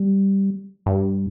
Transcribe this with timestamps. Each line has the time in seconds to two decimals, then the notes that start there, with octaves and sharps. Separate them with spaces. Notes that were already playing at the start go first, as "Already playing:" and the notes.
Already playing: G3
0.86 G2